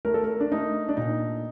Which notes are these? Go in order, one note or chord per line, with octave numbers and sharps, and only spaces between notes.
A3 A#4
A4
A#4
D4
A3 D#4
D4
A#2 D#4